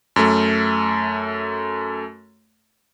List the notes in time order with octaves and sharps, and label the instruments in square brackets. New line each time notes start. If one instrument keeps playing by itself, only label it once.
[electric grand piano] F#2 A3